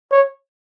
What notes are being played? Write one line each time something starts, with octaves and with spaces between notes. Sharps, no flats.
C#5